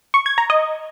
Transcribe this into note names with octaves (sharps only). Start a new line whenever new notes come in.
C#6
G#6
A#5
D#5